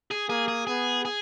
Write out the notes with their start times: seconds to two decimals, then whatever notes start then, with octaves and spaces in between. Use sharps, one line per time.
0.11 G#4
0.29 A#3 G#4
0.48 G#4
0.67 B3 G#4
1.05 G#4